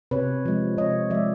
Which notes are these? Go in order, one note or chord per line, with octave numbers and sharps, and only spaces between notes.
C3 B4 C#5
F3 G#3
C3 C#5 D#5
F3 G#3 D5 E5